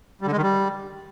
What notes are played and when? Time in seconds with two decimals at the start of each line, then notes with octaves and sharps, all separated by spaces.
0.21 G3
0.26 D3
0.32 G#3
0.37 D#3
0.43 G3